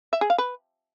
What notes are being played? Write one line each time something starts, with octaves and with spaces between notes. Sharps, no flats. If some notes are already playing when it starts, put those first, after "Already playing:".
E5
G#4
F5
B4